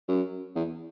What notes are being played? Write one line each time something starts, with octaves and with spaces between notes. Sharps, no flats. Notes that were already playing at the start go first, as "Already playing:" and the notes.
F#2
E2